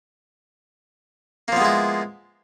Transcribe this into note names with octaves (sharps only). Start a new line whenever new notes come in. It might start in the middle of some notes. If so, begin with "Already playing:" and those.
F3 G#3 A#3 B3 E4